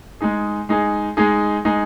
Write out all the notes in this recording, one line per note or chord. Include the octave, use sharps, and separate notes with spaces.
G#3 D#4 G#4
G#3 D#4 G#4
G#3 D#4 G#4
G#3 D#4 G#4